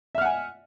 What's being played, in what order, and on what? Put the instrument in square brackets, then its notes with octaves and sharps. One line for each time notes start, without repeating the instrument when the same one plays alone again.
[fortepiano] E5
F6
F#5
G#5